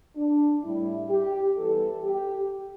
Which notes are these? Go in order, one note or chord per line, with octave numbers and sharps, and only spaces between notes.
D4
A2 G3 E4
G4
E2 E3 G3 A4
G4